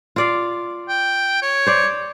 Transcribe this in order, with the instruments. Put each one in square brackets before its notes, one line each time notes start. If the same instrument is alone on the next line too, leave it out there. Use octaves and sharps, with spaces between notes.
[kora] F4 D5 F5
[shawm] G5
C#5
[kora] C5 D5